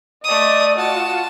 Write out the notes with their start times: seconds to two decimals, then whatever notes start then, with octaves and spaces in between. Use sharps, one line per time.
0.24 A3 D5 D#5 D#6
0.79 F4 F#4 A5